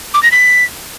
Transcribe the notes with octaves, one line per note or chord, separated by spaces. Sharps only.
D6
A#6
B6